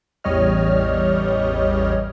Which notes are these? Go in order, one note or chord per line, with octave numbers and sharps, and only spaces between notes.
A1 E2 G3 C#5 D#5 F6